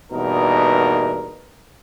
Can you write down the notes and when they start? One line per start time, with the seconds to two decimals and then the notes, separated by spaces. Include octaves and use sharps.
0.12 E2 G2 B2 A#3 D#4 A#4